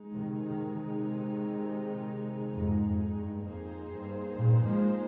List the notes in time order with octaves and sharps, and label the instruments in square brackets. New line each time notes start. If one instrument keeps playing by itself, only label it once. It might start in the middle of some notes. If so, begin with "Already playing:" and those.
Already playing: [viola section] G#3 D#4 G#4
[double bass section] C3 D#3
C3 D#3
C3 D#3
F2 G#2
F2
G2
[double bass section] F2 [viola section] A#3 D#4 G#4 C5
[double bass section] G2
G2 A#2
F3 G#3